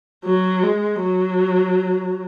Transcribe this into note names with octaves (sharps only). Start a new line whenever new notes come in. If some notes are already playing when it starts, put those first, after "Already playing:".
F#3
G#3
F#3